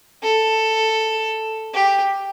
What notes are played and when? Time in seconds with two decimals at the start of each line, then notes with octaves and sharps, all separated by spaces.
0.23 A4
1.74 G4